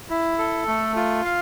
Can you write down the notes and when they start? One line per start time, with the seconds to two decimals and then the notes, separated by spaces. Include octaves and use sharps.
0.10 E4
0.38 A4
0.67 A3
0.96 F4
1.25 F5